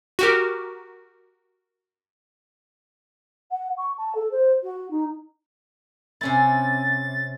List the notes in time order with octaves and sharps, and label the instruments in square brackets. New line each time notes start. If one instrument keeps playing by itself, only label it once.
[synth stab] F#4 G4 A#4
[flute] F#5
C#6
A5
A4
C5
F#4
D#4
[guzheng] C3 C#4 E4 [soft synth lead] A6